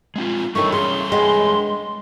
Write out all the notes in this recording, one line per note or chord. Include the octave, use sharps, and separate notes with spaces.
G#3 C4 F4
D#3 G3 A3 D4 E4 C#5 C#6
C#3 C6
G#3 B3